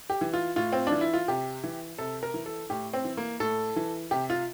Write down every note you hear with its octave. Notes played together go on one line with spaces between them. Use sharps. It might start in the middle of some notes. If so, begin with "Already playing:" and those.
G4
E3
F4
A2 F4
C4
E3 D4
E4
F4
C3 G4
E3
C3 A4
A#4
E3
A4
A2 G4
C4
E3
A#3
A2 A4
E3
C3 G4
F4